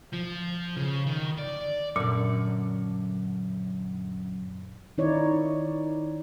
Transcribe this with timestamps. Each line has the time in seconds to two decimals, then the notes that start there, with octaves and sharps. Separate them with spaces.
0.13 F3
0.77 C#3
1.07 D#3
1.38 D5
1.96 F#2 A#2 D3
4.98 D#3 D#4 E4 C#5 D5